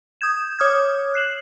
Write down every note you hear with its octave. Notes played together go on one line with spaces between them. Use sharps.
D#6 G6 G#6 E7
C#5 D6 D#6 F6 G6 G#6
F#6 C7 E7 F#7